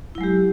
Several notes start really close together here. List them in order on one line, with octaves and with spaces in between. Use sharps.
E4 F#3 G#3 G4